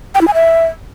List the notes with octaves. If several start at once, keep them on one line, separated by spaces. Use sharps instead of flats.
G5
E4
G#5
E5